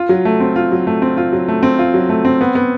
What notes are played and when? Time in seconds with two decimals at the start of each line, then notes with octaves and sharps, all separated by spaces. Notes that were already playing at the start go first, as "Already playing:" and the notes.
Already playing: F4
0.09 F#3
0.25 A3
0.40 C4
0.56 F4
0.71 F#3
0.87 A3
1.02 C4
1.17 F4
1.33 F#3
1.48 A3
1.63 C4
1.79 F4
1.94 F#3
2.09 A3
2.25 C4
2.41 B3
2.55 B3